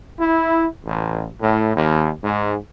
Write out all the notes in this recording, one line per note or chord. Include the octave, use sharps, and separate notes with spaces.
E4
A1
A2
D#2
G#2